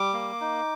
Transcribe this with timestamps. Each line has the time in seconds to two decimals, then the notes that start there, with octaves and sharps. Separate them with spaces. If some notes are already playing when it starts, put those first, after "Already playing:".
Already playing: G3 D6
0.13 A#3
0.41 D#4